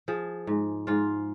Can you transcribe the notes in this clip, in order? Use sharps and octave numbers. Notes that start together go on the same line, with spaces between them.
F3 G#4
G#2
G#2 F4